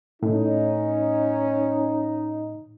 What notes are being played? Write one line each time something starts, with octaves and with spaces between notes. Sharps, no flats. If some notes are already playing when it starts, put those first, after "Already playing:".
A2 C#4 D#4